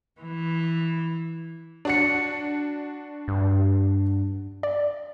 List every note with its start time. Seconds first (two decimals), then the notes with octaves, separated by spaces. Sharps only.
0.20 E3
1.85 D4 F#4 C#7
3.28 G2
4.63 D5